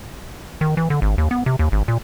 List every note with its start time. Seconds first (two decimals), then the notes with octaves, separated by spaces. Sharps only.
0.61 D#3
0.77 E3
0.90 D3
1.02 G#1
1.18 D#2
1.31 B3
1.46 C3
1.59 D#2
1.72 G#1
1.88 A#2